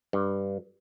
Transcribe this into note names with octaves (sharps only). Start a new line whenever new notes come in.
G2